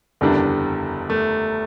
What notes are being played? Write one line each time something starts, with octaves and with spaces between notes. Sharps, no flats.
F#1 E2 D3 G3 D4
A3